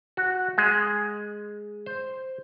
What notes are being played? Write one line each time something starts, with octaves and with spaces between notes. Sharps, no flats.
F#4
G#3
C5